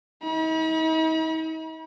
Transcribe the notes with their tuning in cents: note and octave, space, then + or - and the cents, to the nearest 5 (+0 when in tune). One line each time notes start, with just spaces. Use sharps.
D#4 +45 B5 -40